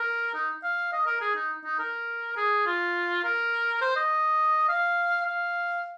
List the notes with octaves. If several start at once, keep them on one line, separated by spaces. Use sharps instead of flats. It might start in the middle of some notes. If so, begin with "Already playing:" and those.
Already playing: A#4
D#4
F5
D#5
A#4
G#4
D#4
D#4
A#4
G#4
F4
A#4
C5
D#5
F5
F5